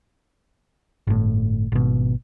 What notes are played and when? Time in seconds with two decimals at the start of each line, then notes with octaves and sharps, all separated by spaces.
1.07 G1 A2
1.72 G#1 B2